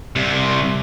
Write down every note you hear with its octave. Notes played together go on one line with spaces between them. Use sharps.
C2 C3